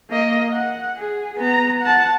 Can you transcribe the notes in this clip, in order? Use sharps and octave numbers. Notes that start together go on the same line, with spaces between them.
A#3 D#5
F#5
G#4
B3 A#5
F#5 A5